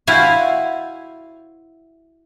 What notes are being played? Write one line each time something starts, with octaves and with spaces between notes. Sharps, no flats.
E4 F#4 C5 F5 G#5 A5